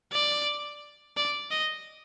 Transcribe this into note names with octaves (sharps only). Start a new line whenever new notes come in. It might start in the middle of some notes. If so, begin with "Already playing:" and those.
D5
D5
D#5